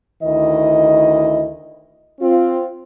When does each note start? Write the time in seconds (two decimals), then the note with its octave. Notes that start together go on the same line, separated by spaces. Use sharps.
0.23 D2 D#3 E4 D#5
2.21 C4 F4